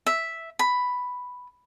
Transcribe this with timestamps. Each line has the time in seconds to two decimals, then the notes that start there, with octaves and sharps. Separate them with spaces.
0.06 E5
0.59 B5